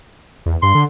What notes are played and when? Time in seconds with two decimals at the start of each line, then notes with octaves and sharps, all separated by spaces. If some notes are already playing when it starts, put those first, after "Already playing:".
0.46 E2
0.63 G2 C6
0.75 D3